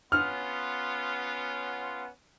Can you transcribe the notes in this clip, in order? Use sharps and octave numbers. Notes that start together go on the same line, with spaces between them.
B3 C#4 F4 F6